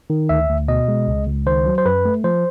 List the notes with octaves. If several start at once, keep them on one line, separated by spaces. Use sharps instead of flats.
D#3
D2 E5
D2
B2 D#5
G#3
C#2
C#2
D#3 C5
F#3
C5
F#2 B4
A3
F3 C5